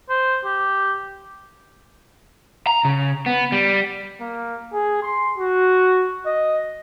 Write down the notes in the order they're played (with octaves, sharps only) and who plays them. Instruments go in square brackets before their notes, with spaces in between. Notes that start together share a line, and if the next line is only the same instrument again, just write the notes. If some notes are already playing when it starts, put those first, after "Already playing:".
[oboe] C5
G4
[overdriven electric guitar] A#5
C#3
B3
G3
[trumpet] A#3
G#4
C6
F#4
D#5